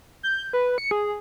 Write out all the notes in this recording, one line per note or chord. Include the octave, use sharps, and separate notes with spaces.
G6
B4
C#7
G#4